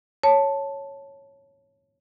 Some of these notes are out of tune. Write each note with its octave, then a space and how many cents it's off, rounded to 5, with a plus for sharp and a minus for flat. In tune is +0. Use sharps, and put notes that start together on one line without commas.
C#5 +0 A5 +0